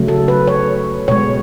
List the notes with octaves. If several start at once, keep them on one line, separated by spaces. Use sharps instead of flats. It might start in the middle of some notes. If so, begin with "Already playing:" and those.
Already playing: C#3 F#3 A3
A4
B4
C#5
B2 G#3 C#5